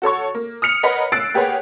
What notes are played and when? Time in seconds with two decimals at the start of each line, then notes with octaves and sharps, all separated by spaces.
0.02 F#4 A4 C#5 C#6
0.35 A#3
0.62 D#6 F6 C#7 F7
0.83 A#4 B4 C#5 D#5 F#5 B5
1.12 E6 F#6 A6 C7 D7
1.34 A#3 G4 G#4 B4 C#5 F#5